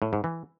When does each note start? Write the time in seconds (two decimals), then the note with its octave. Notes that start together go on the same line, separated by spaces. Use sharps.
0.02 A2
0.13 G#2
0.24 E3